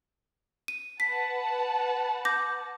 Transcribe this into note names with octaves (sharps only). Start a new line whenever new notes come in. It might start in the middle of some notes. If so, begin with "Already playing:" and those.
D#7
B4 F#5 A5 B6
D6 G6 A#6